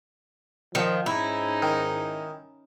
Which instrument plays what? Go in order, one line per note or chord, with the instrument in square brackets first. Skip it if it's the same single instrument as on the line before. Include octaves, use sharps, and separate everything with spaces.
[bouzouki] D#3 [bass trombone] F3
[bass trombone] G#2 [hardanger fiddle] C#4 D#4 [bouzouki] E4
[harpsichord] D#3